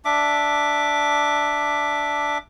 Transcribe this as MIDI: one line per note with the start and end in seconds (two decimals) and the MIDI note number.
0.05 2.38 62
0.05 2.38 76
0.05 2.38 86